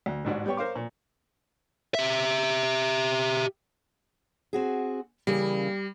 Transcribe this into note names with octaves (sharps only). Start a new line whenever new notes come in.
D2
A1 G#2 F#4 D5
G3 B3 C#5 G5 C#6
A#4 C5 C#5 F5 C6 D6
A#2
G4 E5
C4 F#4 G#4
C#3 E3 G3 A#3